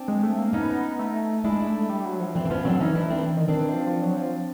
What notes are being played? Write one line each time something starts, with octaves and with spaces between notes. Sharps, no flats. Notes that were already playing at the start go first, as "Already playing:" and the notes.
Already playing: C4 D4
G#3
A3
A#3
B3 C#4 D#4
A3
G#3 D4 E4
A3
G3
F#3
F3
E3 C4 D4
C4
F3 B3 C#4
F#3 C4 D4
E3 C#4 D#4
D4 E4
C4 D4
D#3
D#3 C4 D4
E3
F3
F3
F#3
F3